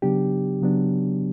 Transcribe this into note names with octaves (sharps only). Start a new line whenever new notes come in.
C#3 F#3 B3 D4 G4
C#3 F#3 B3 D4